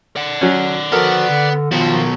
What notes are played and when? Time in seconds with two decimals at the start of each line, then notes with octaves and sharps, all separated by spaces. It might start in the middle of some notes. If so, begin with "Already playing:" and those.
0.16 D5 F#5
0.41 F#3 C#4
0.92 D3 F3 B3 F#4 A4 A#4
1.29 D3
1.71 B2 D#3 F3 F#3 F4